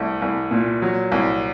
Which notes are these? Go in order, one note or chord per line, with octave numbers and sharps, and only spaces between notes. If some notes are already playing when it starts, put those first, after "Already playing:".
Already playing: C2 A3
C2
A#2
F#3
C2